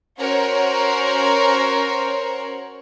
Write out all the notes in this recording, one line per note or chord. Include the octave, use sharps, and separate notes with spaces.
C#4 F#4 A#4 C5 C#5